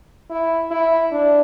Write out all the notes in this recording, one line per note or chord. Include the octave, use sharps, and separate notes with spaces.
E4
E4
D4